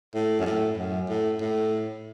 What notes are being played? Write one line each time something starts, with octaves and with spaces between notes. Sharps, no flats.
A2
F#2
A2
F#2
A2
A2